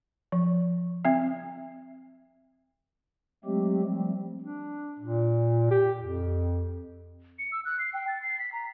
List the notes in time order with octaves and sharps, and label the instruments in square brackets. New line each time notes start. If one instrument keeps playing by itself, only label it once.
[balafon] F3
C4 E5
[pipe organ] F#3 G#3 A3 C4 G4
F3 G3 A3 C4
[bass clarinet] D4
A#2
G4
F2
[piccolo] C#7
E6
F#6
C7
G5
A6
C7
B6
A#5